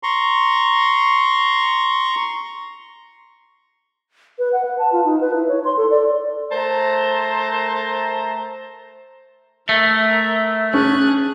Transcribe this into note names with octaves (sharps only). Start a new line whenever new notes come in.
A#5 C6 C#6
B4
F#5
B4
A5
F4
D#4
B4
E4
C#5
C6
A4
D5
A3 A#4 C5 A5 A#5
A3 A#4 E5
C#4 G#4 A5 F#6